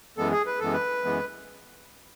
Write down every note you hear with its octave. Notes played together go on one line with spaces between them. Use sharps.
F#2 E3 G#3 B3 A4
G#4
B4
F#2 E3 G#3 B3 A4
B4
F#2 E3 G#3 B3